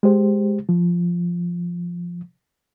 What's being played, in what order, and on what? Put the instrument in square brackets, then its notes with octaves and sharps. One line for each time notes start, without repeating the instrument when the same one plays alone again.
[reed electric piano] G#3 G4 C5
F3